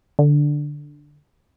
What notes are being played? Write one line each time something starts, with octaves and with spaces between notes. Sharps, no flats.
D3